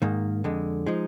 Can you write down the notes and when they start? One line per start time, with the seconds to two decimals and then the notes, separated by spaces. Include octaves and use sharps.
0.02 G#2 D#3 A#3
0.44 F2 D3 G#3
0.86 F3 G#3 D#4